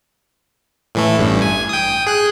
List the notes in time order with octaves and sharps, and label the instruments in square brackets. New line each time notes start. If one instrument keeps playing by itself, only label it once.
[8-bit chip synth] A2 E3 A3
A1 G2
G#5
G5 D#6
G#4 F#6